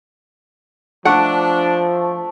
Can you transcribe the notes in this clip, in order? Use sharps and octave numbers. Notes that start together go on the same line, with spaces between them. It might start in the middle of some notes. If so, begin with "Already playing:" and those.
F3 A3 D4 F#5